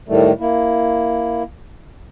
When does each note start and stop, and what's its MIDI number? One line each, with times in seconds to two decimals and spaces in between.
0.08 0.32 45
0.08 0.32 51
0.08 0.32 55
0.08 0.32 57
0.40 1.43 58
0.40 1.43 64